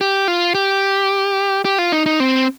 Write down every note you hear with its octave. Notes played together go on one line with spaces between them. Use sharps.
G4
F4
G4
G4
F4
D#4
D#4
C4